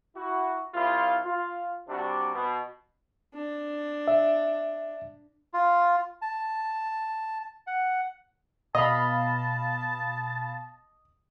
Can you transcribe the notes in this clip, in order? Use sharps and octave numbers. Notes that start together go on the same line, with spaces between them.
E4 F#4
C2 E4 F4
F4
C3 G3 D4 F#4
B2
D4
E5
F4
A5
F#5
B2 D#5 F5 A5 B5